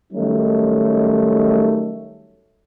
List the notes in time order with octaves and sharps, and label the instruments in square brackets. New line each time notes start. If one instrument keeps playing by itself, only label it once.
[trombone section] D#3 F#3 G3 A3 C#4 D#4